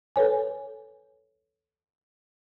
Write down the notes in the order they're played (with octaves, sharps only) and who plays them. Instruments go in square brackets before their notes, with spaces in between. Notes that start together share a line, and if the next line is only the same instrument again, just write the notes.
[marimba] A4 B4 C#5 G#5